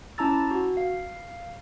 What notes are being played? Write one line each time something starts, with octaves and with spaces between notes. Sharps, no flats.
C#4 E4 A5 A#5 E6 A6
F#4
F5